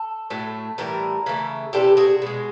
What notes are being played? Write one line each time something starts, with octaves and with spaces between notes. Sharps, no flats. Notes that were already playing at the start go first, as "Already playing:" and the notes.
Already playing: A4
A2 F#3 A3
A2 E3 G3 A#4
C#3 E3 A3
C3 E3 G3 G4 A4
F#4 G#4
B2 G#3